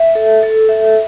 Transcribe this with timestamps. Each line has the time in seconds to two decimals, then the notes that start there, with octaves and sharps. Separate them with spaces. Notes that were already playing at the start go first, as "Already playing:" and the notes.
Already playing: E5
0.15 A4
0.43 A4
0.69 E5